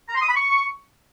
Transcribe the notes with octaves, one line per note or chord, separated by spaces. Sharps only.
A#5
C6
D#6
B5
C#6